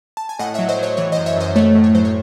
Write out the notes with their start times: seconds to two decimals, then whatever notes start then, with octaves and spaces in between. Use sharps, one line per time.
0.17 A5
0.29 G#5
0.39 A2 D#5 F#5
0.54 F#3 C#5 E5
0.69 C5 D#5
0.78 F#3 C#5
0.97 E3 C#5
1.12 F#2 C5 D#5
1.26 C#5 E5
1.37 F#2 C5 D#5
1.56 A3 C#5
1.75 A2
1.84 C#5
1.94 F#3 C5
2.05 C#5